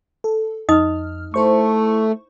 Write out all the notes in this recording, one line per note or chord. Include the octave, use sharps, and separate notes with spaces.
A4
F2 D#4 D#5 D#6 F6
A3 E4 C5 C#6